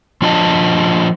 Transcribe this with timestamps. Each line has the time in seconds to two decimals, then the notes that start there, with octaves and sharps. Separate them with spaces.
0.22 F3 D4 F4 D#5 G#5 A5